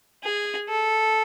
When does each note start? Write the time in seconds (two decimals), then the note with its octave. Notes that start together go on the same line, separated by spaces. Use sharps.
0.23 G#4
0.69 A4